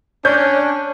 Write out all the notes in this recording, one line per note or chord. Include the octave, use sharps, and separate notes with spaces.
C#4 D4 C#5 G6